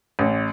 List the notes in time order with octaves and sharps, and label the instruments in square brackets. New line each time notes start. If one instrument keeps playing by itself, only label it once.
[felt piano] A1